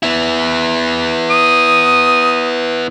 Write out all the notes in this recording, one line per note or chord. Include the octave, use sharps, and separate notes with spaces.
B3 E4
D#6